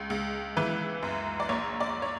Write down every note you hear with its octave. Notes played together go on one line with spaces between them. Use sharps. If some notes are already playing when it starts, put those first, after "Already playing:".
Already playing: C#2
C#2
E3 B4
F#2
D5
A#1 C#5
D5
C#5